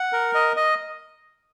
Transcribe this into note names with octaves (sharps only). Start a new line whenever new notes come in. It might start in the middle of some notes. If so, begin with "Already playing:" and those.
Already playing: F#5
A#4
D#5
D#5